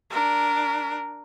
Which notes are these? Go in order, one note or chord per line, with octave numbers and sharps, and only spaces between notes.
D4 A#4